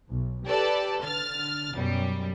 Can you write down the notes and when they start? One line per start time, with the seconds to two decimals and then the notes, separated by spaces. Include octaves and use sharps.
0.11 B1
0.47 G4 A4 B4 D5 A5
1.03 D3 F6 A6
1.73 F#2 B2 F#3 G3